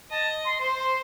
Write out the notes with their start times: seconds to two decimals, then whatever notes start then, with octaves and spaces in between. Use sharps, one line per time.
0.10 D#5 A5
0.44 C6
0.61 C5 C6
0.78 C6